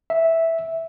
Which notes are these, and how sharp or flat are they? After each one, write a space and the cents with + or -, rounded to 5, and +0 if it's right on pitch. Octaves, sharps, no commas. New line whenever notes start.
E5 -5